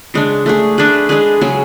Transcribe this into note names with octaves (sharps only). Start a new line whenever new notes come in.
C#3 G#3 D4
A3 D4 G#4
A3 D4 G#4 B4
G#3 D4 G#4 B4
C#3 F#3 C#4 G#4